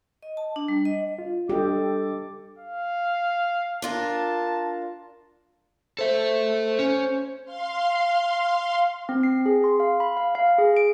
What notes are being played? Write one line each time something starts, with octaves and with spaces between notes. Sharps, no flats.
D#5
A5
D4
G3
D#5
F4
G3 D4 G4 A4 D#5 D6
F5
D4 F4 A#4 A5
A4 C5 E5
C#4
F5 C6
C4
C7
G#4
C6
F5
B5
F5
F5
G#4
D7